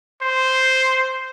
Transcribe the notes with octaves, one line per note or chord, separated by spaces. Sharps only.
C5